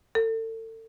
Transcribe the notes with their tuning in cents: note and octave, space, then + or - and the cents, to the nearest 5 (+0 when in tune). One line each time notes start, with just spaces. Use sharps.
A4 +35